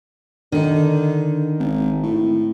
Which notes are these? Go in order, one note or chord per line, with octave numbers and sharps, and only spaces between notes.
D3 D#3 D#4
G#1
A2